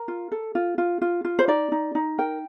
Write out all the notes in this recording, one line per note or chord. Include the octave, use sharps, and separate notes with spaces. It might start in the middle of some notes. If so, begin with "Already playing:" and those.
Already playing: A#4
F4
A4
F4
F4
F4
F4
C5
D#4 D5
D#4
D#4
A#4 G5